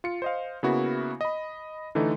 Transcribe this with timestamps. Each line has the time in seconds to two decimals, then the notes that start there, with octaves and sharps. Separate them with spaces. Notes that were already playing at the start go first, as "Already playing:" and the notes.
0.04 F4 C#7
0.22 C5 D#5 F5
0.63 C#3 A#3 B3 E4 F#4
1.21 D#5 B5
1.95 D3 E3 A3 D#4